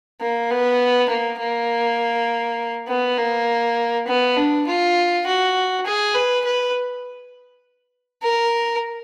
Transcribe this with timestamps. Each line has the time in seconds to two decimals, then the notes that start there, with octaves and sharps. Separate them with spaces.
0.21 A#3
0.51 B3
1.10 A#3
1.40 A#3
2.88 B3
3.18 A#3
4.08 B3
4.37 D4
4.67 F4
5.26 F#4
5.86 G#4
6.15 B4
6.45 B4
8.23 A#4